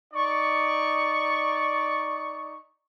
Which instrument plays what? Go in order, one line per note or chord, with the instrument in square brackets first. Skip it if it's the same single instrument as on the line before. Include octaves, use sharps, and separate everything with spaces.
[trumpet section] D#4 D5 C#6